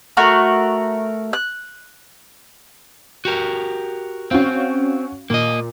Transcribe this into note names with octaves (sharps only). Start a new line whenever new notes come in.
A3 F#4 A#4
F#6
F#4 G4 A#4
C4 C#4 F#4 F5
A#2 A#3 D#5